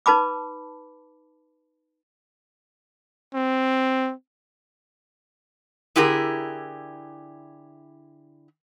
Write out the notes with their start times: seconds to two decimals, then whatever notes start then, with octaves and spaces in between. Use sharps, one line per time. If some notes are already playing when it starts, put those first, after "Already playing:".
0.06 D#4 B4 A5 B5 D6
3.34 C4
5.96 D3 E4 G4 G#4 A#4